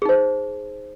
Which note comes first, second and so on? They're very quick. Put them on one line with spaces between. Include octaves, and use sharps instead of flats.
G#4 D#4 C5